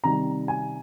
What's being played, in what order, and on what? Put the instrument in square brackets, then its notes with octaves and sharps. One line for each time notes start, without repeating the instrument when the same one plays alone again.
[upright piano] C3 D#3 G3 A#5
G#5